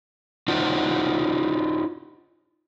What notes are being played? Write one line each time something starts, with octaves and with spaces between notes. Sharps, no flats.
D#4 F4 F#4 C5 D5